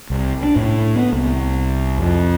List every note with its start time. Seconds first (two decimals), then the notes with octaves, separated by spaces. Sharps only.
0.10 C2
0.43 D4
0.56 A2
0.96 B3
1.13 C2
1.98 F2